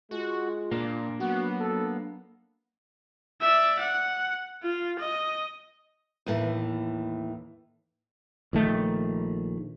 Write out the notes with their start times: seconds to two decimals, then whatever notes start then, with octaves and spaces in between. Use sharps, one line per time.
0.11 G#3 F4 F#4
0.71 A#2 A#3 D4
1.20 F#3 B3 F#4
1.60 A4
3.41 D5 E5
3.79 F#5
4.63 F4
4.99 D#5
6.26 D#2 A2 E3
8.53 A#1 D#3 A3